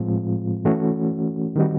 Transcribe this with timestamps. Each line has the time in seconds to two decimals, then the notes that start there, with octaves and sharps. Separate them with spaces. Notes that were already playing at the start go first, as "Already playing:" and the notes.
Already playing: A2 F3 G#3 C4 F4
0.65 E3 A3 C#4 F#4
1.56 D#3 G3 C4 D#4 F#4